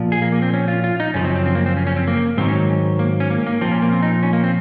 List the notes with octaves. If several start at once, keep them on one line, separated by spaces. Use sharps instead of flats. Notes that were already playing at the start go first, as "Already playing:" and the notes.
Already playing: A#2 F3
G#4
A#3
A#3
C4
C#4
F4
F4
D#4
F#2 C#3 F3 C#4
C4
C4
C4
A#3
C4
C#4
C#4
C4
A#3
G#2 D#3 F#3 C4
C#4
A#3
C#4
A#3
A#3
A#2 F3 C4
C#4
A#3
C4
D#4
C#4
A#3
C4